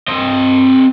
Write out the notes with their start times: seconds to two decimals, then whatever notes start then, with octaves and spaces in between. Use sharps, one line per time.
0.08 C4 D#5